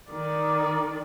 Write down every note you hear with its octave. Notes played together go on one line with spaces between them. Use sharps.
D#3 D5